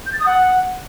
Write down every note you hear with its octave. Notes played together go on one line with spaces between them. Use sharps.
G6
A6
D#6
F#5